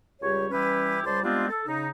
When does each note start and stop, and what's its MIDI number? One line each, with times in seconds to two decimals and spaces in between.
0.22 0.47 37
0.22 0.47 55
0.22 0.47 67
0.22 0.47 73
0.51 1.00 52
0.51 1.00 55
0.51 1.00 61
0.51 1.00 64
0.51 1.00 67
0.51 1.00 71
1.04 1.22 37
1.04 1.22 55
1.04 1.22 72
1.04 1.22 74
1.04 1.22 81
1.04 1.22 84
1.23 1.46 55
1.23 1.46 56
1.23 1.46 59
1.23 1.46 60
1.23 1.46 62
1.23 1.46 65
1.50 1.62 69
1.67 1.88 49
1.67 1.88 63